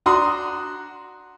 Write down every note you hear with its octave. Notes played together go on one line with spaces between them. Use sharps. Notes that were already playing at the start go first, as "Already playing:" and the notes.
D4 F#4 A#5 C6 D#6